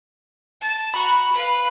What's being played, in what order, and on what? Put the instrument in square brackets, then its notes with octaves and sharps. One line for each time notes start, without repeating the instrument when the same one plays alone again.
[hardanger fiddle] A5
[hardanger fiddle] F#4 A#5 [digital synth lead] B5
[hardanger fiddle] B4 F5